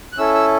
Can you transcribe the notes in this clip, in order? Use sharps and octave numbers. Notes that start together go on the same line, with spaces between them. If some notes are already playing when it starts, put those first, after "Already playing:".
F#6
C#4 E4 A4 E6
E6